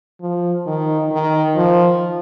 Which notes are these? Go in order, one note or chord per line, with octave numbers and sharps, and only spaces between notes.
F3
D#3
D#3
F3